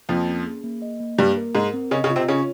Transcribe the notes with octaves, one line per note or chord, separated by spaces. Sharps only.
F2 F3 A#3
C#4
G#4
A#3
D#5
A#3
G2 G3 A#3
A#4
G#2 G#3 A#4
C4
C#3 C#4 D#5
C#3 C#4
F4
C3 C4
C#3 C#4 C#5